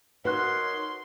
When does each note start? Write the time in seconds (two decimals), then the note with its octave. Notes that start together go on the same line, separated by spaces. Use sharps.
0.25 D#4 F#4 A#4 B4 C#5 C6 F#6